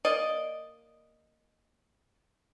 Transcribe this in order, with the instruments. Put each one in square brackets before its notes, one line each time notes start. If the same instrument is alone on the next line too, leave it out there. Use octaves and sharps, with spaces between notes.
[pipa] A#3 D5 D#5